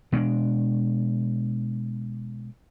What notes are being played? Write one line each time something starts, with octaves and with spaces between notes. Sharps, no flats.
B2 G#3 B3 D4